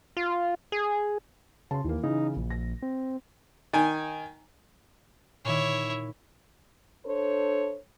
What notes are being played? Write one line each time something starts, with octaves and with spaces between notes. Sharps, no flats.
F4
G#4
C#3 A5 C6
D#2 E3 A#3
C#3 E3 D#4
A#1
A#6
C4
D#3 G#5
A#2 D#3 E4 C#5
D4 A4 C5 C#5